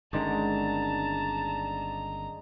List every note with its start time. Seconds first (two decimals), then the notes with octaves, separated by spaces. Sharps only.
0.13 G1 D3 D#3 G#3 C#4 D5 A5 A#5